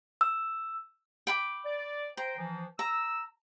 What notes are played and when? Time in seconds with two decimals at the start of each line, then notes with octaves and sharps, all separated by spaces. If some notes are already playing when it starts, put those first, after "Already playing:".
0.21 E6
1.27 G5 B5 D6
1.66 D5
2.17 C5 G5 A#5
2.37 E3 F3
2.79 A#5 E6